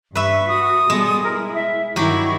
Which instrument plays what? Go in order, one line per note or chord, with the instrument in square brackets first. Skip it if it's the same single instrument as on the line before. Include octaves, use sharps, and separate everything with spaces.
[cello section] G2 [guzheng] B4 E5 [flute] C#6
[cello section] F#4 [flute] D#6
[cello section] B2 G3 A4 [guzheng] G#3
[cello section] E4 [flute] A#4
[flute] E5
[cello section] G2 D#3 E4 [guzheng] F#3 G4 [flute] C#6